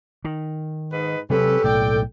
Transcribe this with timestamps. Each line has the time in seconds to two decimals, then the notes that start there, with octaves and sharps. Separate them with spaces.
0.25 D#3
0.92 G#2 D#4 B4
1.30 C3 F#3 C4 C#4 G4 A4 B4
1.64 B1 A2 D5 G5